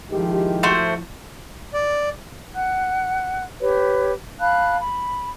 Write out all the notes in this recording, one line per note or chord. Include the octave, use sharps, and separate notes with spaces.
D#3 F3 G#3 E4 G4
A3 F#4 C5
D5
F#5 F#6
G4 B4 C#5
F5 A5 B5 F#6
B5